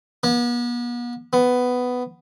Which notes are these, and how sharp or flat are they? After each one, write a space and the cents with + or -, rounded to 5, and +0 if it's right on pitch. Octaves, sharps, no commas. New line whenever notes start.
B3 -40
B3 +10